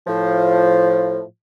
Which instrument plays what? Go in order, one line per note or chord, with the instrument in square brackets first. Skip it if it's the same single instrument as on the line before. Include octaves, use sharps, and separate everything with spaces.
[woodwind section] A2 F3